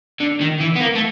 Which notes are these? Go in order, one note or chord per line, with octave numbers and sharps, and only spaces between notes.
D3
D#3
E3
B3
A#3
A3